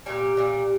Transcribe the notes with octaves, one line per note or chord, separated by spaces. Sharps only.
A#2 G3 G4
A#2 G3